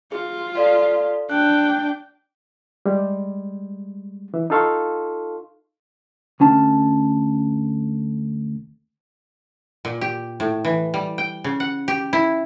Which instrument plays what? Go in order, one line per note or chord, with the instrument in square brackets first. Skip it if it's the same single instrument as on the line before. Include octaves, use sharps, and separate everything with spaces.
[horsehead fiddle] F4 [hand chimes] G#4
[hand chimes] A4 D5 F5
[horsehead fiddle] D4 G5 [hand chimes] F#6
[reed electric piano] G3 G#3
E3
D#4 F4 A4 F5 C6 C#6
[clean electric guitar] D2 C#4 A5
[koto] A#2
G4
A2
E3
G3
G5
C#3
F#5
G4
E4